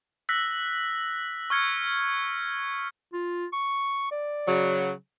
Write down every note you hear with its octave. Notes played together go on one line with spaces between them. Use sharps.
E6 F#6 A#6 B6
C#6 F6 G#6 C#7
F4
C#6
D5
C#3 F#3